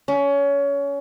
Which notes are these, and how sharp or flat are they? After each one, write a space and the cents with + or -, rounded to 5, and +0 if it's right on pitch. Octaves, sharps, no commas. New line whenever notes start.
C#4 +25